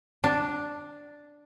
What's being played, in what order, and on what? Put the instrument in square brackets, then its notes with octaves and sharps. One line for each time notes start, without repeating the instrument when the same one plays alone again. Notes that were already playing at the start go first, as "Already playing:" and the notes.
[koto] D4